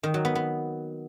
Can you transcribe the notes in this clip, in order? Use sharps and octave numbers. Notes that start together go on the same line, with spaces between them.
D#3
F#3
B3
B3